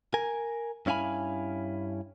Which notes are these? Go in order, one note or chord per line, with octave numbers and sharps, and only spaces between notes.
A#4 G#5
G2 C#4 E4 F5 G#5 B5